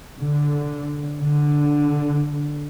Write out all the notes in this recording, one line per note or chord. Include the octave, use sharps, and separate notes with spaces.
D3
D3